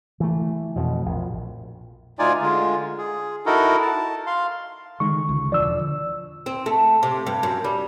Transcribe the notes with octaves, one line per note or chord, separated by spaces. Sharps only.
E3 A3
F2 B2
A#1
D2 D#4 F4 D5 G#5
D3 G#3 F4
G#4
D#4 E4 F#4 A4 A#4
A5
F5 C6
D3 D#3 G#3 C#6
C#2
E1 D3 F3 D5 E6
C4
A3
C3
G2
F#2
G3